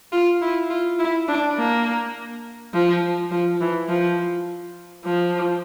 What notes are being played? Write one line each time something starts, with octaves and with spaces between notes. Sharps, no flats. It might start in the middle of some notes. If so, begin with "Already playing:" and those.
F4
E4
F4
E4
D4
A#3
F3
F3
E3
F3
F3